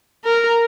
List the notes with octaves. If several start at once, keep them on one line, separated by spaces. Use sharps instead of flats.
A#4